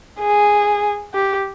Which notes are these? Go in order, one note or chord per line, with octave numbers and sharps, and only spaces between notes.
G#4
G4